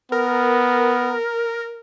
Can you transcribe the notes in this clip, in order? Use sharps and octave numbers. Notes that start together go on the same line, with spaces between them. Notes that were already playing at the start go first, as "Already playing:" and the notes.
B3 A#4